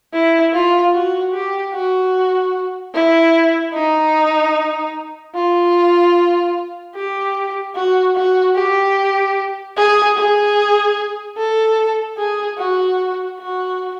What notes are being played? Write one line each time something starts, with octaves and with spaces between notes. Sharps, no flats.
E4
F4
F#4
G4
F#4
E4
D#4
F4
G4
F#4
F#4
G4
G#4
G#4
A4
G#4
F#4
F#4